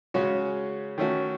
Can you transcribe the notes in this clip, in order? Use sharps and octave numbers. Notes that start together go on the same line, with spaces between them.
C#3 G#3 C#4 F#4 C#5
D#3 A3 C#4 F#4